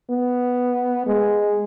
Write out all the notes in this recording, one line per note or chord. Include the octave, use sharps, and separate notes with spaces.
B3
G#3